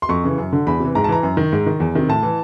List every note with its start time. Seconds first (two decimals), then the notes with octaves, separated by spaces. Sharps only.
0.02 C6
0.09 F2 C#6
0.24 C#3 E3
0.38 F#2
0.53 D3
0.67 E2 B5
0.80 C3 E3
0.95 G#2 A#5
1.04 A5
1.08 E3 A#5
1.23 F#2
1.37 D#3
1.52 G#2
1.66 D#3
1.80 E2
1.95 C3 D#3
2.08 A2 A5
2.23 E3